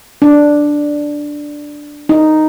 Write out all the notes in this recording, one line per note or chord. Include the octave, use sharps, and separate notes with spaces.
D4
D#4